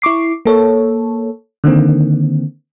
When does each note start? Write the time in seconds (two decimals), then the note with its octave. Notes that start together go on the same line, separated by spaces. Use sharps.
0.02 E4 C#6 D6 C7
0.45 A#3 A4 C#5
1.64 D3 D#3 A#3 C4